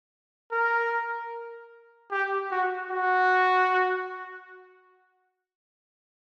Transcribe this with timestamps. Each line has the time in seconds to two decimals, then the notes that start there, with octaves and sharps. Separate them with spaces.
0.52 A#4
2.11 G4
2.51 F#4
2.91 F#4